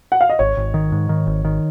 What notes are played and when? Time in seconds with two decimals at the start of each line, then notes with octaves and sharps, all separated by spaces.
0.12 F#5
0.21 F5
0.29 D#5
0.39 G#1 C#5
0.57 G#1
0.74 D#3
0.92 G#2
1.09 D#3
1.27 G#1
1.45 D#3